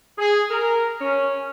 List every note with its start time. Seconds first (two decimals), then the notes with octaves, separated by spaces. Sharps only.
0.18 G#4
0.51 A#4
1.01 C#4